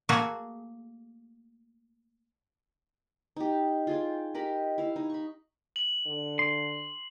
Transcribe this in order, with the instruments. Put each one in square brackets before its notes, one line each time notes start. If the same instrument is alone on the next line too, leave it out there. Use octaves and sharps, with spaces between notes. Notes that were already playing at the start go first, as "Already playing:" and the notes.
[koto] A3 A#3 F#4 G#4
[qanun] D#4 G4
F4 G#4 G5
G4 A#4 D#5 B5
E4 F5
D#4
B5 C#6
[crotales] F#7
[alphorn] D3
[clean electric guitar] C6